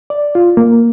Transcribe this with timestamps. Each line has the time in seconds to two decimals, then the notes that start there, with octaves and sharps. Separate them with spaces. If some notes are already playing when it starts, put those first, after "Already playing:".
0.10 D5
0.35 F4
0.57 A#3